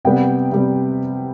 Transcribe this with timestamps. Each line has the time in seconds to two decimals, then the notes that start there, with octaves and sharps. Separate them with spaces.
0.05 C3 G3 B3 G5
0.52 C3 G3 B3